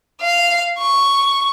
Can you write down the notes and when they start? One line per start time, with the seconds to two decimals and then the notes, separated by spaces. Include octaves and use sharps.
0.21 F5
0.78 C#6